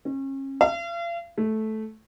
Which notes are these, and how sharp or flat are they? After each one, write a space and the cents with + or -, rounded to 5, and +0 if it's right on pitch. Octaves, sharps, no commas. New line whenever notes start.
C#4 -35
F5 -40
A3 -10